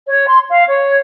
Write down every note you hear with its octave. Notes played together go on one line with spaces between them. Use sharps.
C#5
C6
F5
C#5